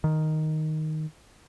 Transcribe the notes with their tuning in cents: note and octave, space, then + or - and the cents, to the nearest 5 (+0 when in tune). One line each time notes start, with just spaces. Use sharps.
D#3 +0